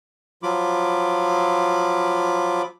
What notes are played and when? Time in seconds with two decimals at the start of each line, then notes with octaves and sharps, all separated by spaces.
0.43 F3 F#3 F4 B5 D6